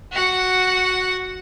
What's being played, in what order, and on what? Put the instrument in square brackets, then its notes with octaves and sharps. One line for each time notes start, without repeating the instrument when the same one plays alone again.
[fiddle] F#4 F#5